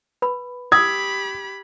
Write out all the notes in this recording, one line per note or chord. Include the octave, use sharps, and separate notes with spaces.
B4 B5
G4 B5 D#6 E6 G#6